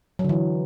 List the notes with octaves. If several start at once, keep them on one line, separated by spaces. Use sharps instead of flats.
F#3
D3
E3